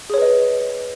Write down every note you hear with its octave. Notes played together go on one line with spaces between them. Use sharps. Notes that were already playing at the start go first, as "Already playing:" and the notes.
G#4 B4 C#5 D#5